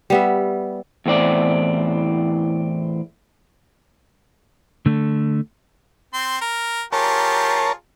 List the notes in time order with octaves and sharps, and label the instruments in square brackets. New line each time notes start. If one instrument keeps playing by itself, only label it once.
[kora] G3 B3 E5
[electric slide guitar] E2 A2 C4 D5
D3 A3
[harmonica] C4 C6
A#4
[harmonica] F4 G4 G#4 [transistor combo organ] A#4 C#5 A5